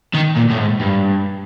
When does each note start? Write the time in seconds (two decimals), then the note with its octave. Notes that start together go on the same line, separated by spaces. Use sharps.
0.14 D#3
0.36 A#2
0.50 A2
0.58 G#2
0.80 G2